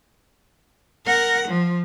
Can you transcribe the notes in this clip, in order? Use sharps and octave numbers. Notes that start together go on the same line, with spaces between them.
A#4 F#5
F3